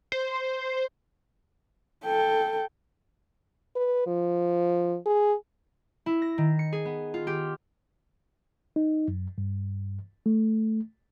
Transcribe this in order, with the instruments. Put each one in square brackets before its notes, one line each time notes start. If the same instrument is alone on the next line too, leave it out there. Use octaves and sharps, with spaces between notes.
[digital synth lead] C5
[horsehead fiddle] A4 G5
[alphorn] B4
F3
G#4
[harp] E4
A#6
D#3
C#7
G#4
B3
F4
G4
[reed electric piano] D#4
F#2
G2
A3